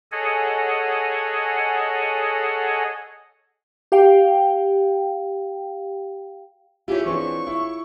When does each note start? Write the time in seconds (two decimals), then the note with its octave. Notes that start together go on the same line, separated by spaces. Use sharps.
0.12 G#4 A4 C#5 D#5 F#5 G#5
3.92 G4 F5 G5
6.88 E4 F4 G4 G#4 C#5 E5
7.06 E3 C4 D4 C#6
7.47 E4